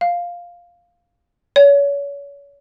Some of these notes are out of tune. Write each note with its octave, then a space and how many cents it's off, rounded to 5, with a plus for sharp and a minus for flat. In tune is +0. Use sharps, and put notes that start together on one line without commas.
F5 +0
C#5 +35